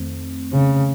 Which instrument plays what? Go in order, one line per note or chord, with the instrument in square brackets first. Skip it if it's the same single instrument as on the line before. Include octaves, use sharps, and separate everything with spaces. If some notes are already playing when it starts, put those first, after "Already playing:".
Already playing: [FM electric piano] F2 D#3 A3 C4
[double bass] C#3